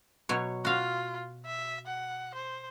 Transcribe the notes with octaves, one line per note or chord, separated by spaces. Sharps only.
B2 F#3 C#5
F4 F#4 F5
E5
F#5
C5